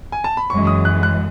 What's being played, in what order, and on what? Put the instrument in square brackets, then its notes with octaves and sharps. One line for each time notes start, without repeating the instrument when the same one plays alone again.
[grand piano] G#5
A5
B5
[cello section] F#2 E3 G#3 [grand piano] C#6
[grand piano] D#6
F#6
F#6